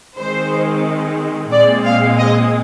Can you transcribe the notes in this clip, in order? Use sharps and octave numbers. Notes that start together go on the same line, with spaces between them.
D#3 G#3 C4 C5
A#2 G#3 C4 D5
F5
D#5